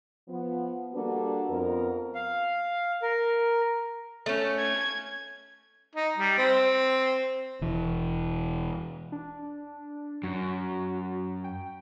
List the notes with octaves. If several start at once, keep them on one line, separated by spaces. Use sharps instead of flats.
F3 B3
G3 A#3 D4 F#4 A4 B4
F2 B3 A#4
F5
A#4
A3 C#4
G#6
D#4
G3
C4
E1 E3
D4
F#2 F#4
G5